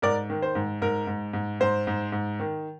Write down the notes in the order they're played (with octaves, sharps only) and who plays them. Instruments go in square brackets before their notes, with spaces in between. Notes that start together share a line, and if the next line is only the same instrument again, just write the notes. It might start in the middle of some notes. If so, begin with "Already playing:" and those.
[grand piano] G#2 A#4 D5
D#3
C5
G#2
G#2 A#4
G#2
G#2
G#2 C5
G#2
G#2
D#3